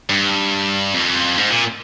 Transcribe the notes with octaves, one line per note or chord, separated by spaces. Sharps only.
G2
F2
G#2
A#2